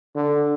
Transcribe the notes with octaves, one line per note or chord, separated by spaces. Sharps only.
D3